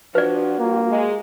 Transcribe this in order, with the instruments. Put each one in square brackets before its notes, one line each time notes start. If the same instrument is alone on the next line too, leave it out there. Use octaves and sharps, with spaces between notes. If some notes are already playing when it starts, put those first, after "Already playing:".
[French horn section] F3 D4 [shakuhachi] F#4 [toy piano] B4 D5
[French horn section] G2 F4 [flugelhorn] A#3
[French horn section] G#3